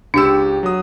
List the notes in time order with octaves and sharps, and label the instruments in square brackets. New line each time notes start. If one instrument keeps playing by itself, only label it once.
[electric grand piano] C#2 G4 E7 [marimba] D4 E6
[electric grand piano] F#3 D#6